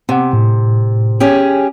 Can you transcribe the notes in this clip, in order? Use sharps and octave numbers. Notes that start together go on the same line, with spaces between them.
C3 C4 F#5
A2
C#4 G4 G#4